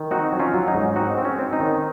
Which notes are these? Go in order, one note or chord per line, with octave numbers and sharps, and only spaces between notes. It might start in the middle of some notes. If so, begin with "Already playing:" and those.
Already playing: D#3
C4 D#4 F#4
F#3
C#4 F4
F#3
D#4
G#2
C4 D#4 F#4
C4
C#4
C4
D#4
D#3